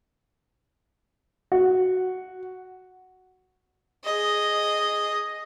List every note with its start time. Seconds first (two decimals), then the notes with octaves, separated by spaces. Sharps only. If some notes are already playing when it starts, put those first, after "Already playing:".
1.52 F#4
4.04 G#4 D#5